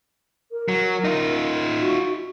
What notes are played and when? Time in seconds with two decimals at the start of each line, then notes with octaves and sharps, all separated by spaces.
0.52 A#4
0.68 F#3
1.04 D#4 F4
1.81 F#4